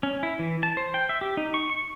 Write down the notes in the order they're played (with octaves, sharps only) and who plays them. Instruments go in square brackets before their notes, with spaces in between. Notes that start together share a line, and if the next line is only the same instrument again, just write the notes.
[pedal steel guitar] C#4
E4
E3
A5
C5
G5
E5
G4
D#4
C#6
C#6